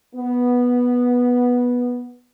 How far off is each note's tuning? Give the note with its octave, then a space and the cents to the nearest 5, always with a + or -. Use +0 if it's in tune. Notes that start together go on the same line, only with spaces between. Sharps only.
B3 -10